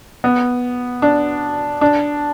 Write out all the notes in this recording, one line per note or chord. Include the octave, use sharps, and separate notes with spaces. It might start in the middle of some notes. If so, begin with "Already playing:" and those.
B3
D4
D4